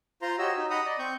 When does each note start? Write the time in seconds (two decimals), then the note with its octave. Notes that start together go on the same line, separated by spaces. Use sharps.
0.22 F4 C5 A#5 C6
0.39 F#4 G4 C#5 D#5 E6
0.57 D#4
0.70 D#5 F#5 A#5 B5 D#6
0.86 D5 D#5
0.99 C4 C#6 G6